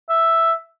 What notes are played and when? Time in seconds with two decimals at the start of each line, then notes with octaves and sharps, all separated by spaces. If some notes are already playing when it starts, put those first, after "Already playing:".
0.10 E5